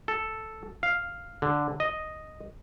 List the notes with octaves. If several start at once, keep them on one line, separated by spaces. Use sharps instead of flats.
A4
F5
D3
D#5